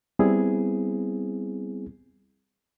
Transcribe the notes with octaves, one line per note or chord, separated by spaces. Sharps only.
G3 B3 C4 E4 G#4